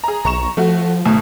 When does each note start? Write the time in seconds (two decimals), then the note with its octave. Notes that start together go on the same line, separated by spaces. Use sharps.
0.04 G#4 A#5
0.25 B1 A#5 C#6 E7
0.57 F3 A3 F#4
1.06 G#1 B2 A3